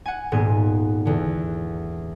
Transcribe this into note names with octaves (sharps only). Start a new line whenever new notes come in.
F#5 G#5
D#1 G#2 A#3 B3 G#6 D#7
E2 D3